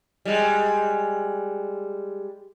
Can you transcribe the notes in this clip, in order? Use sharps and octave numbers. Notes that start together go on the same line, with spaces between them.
G3 G#3